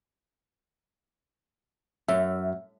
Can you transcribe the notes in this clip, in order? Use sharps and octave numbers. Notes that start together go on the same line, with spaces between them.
F#2 E5